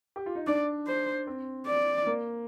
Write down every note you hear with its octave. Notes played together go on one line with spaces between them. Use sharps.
G4
F4
D#4
D4 D5
C5
C4
D5
A#3